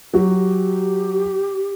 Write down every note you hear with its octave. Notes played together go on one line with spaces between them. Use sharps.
F#3 F#4 G4